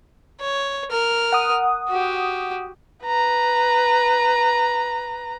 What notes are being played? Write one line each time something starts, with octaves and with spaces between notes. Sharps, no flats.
C#5
A#4 F6
F#5 D#6
F#4 G4
B4 A#5